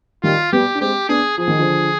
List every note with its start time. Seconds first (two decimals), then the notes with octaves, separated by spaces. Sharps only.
0.23 D#3 G3 F4
0.53 G3 B3 G4
0.75 D4
0.81 G#3 C4 G4
1.09 B3 D4 G#4
1.38 F3 G#4
1.48 D#3
1.59 D3 F3